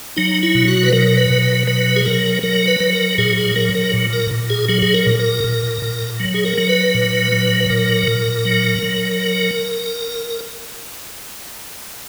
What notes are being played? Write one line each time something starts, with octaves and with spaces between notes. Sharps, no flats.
F#3 D#4
E4
B2
F#4
B4
F#3 A#4
B4
B2
B4
F#3 B4
G#4
F#3 A#4
F#3 A#4
B4
F#3
A#4
A#2 G#4
G#4
F#3 A#4
A#4
A#2
A#4
A#2
G#4
F#3 G#4
G#4
A#4
A#2
A#4
A#2
A#2
F#3
G#4
A#4
F#3
B4
A#2
F#3
B4
A#2 A#4
A#2
F#3
F#3